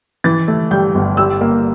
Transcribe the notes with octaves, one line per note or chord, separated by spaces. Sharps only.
E3 A6
A3
G2 G6
G1
G3 E6
A#3